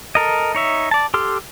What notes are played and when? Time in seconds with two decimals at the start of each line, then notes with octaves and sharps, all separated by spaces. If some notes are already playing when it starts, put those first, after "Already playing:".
0.15 A4 A#4 D#5
0.55 D#4 C#5 E5
0.91 D5 A5
1.14 G4 A4 C6 F6